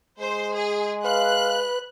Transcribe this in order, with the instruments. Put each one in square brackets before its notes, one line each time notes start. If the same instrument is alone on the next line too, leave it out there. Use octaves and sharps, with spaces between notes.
[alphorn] G#3 [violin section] C5
[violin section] G#4
[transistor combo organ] B4 [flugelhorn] F5 [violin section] F#6